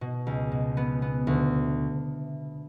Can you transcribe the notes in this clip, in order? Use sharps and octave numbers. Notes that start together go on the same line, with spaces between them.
B2
C#2
B2
B3
B3
D2